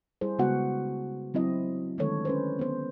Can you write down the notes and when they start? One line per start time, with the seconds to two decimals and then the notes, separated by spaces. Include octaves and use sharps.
0.21 G3 E4 G#4 C5
0.39 C#3 G#3 B3 F#4 F#5
1.34 F#3 C4 E4 D#5
1.98 D3 D#3 G#3 A3 A4 C#5
2.25 C#4 B4 C5
2.59 B3 C5